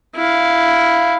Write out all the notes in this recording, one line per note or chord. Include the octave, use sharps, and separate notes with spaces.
E4 F5